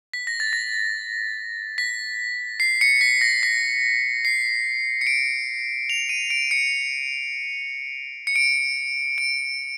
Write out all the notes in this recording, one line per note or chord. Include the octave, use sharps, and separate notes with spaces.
B6
A#6
A6
A#6
B6
C7
C#7
B6
A#6
B6
C7
C#7
D7
F7
D#7
D7
C#7
C#7
D7
D7